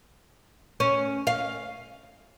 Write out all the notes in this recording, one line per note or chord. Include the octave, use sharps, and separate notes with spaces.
C#4
F5